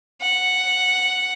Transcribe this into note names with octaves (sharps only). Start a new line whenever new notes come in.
F#5